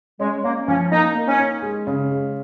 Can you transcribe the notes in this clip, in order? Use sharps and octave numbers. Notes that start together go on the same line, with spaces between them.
G#3 C#4
A#3 C#4
F3 C#4
A#3 D#4
A#3
C#4
D#4
G#3
C#3
G#3